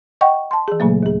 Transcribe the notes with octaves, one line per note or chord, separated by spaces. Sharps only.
D#5 F#5 G5 C#6
A5 C6
E3 G#4
A#2 C#3 F#3 A3 A#3
D#2 G#4